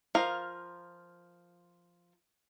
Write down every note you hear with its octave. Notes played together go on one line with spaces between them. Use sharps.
F3 F4 A#4 F5